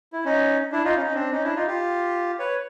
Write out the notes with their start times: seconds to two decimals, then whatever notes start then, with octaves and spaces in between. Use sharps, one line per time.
0.13 E4
0.25 C#4 D#4
0.72 D4 E4
0.84 D#4 F4
0.96 C#4 D#4
1.06 C#4
1.14 C4 D4
1.32 C#4 D#4
1.44 D4 E4
1.55 D#4 F4
1.67 F4 G4
2.39 B4 C#5